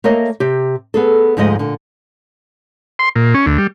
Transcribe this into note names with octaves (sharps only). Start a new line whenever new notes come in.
A3 A#3 A#4 C#5 D#5
C3 G4
B3 G#4 A4
D2 G#2 F3 G#3 D#5
A#2 D3
C6
A#2
C#4
D2
G3